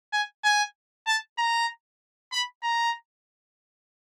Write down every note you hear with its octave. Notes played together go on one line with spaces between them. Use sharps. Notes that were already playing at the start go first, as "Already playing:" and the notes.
G#5
G#5
A5
A#5
B5
A#5